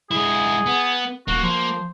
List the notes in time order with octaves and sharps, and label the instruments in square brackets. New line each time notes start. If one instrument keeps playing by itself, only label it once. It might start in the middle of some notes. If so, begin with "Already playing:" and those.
[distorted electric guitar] G#3 E4 [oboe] G#4
[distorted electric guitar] B3
[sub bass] D#1 [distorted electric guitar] A#3 [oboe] F#4
[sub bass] F3 [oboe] C5